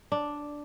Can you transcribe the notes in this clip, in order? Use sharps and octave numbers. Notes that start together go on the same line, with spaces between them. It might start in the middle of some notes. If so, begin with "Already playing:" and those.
D4